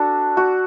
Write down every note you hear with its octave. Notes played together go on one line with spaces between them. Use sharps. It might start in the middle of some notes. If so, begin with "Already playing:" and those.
Already playing: D4 F#4 A4
F#4